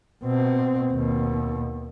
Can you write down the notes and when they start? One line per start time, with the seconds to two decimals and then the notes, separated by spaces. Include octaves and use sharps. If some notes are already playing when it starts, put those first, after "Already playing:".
0.23 B2 C4
0.91 D#2 B2